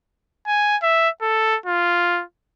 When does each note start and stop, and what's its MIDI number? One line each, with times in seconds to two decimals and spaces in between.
0.47 0.77 80
0.82 1.09 76
1.22 1.57 69
1.66 2.23 65